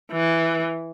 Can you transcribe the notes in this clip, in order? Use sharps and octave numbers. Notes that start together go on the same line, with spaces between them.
E3